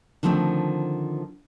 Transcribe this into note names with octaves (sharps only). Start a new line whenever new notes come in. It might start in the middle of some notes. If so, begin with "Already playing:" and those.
D3 D#3 F3 A3 C4